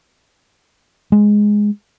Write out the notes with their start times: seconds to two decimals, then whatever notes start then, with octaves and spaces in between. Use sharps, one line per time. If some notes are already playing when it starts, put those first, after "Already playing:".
1.12 G#3